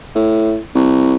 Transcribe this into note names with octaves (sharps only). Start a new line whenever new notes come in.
A2
C2